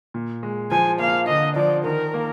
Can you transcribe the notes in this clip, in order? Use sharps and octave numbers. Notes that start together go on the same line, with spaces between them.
A#2
G#3
F3 G#5
A#3 F5
D3 D#5
F3 D5
D#3 A#4
A#3